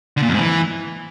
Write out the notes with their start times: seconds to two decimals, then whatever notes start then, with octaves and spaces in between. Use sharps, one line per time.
0.17 D3
0.22 A#2
0.28 F2
0.34 G#2
0.39 E3